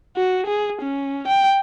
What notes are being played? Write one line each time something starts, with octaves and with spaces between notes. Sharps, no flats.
F#4
G#4
C#4
G5